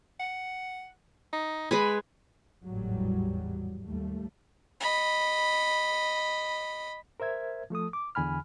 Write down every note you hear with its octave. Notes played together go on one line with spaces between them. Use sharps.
F#5
D#4
G#3 B4 G#5 B5
G#1 E2 A2 F#3 G3
D#2 G3 A3
D#5 B5
A#4 C5 E5 G#6
F3 A3 A4 D#6
D6
E2 D3 G#5 B5 F6